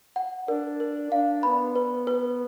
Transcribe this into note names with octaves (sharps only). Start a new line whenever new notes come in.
F#5
D4 A#4
A#4
D4 F5
B3 B5
B4
B4